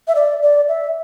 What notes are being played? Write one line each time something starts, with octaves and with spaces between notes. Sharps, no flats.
E5
D5
D5
E5